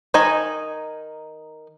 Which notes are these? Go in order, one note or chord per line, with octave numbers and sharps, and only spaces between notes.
D#3 D#4 D#5 G#5